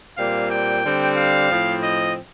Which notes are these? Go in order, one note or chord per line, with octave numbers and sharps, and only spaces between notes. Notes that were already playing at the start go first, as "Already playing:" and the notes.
A#2 G3 C4 F5
G5
D3 G3 C4
F5
A2 F3 C4
D#5